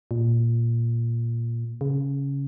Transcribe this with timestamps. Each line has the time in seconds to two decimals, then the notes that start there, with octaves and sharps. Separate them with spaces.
0.11 A#2
1.81 C#3